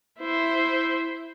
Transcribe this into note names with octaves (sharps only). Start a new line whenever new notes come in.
E4 C5